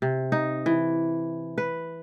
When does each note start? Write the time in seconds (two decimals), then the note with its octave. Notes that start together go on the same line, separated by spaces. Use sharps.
0.02 C3
0.32 D#4
0.66 E3
1.58 B4